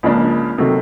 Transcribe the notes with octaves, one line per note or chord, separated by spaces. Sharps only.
C#2 C#3 F3 A#3 D4
C3 D#3 F#3 A3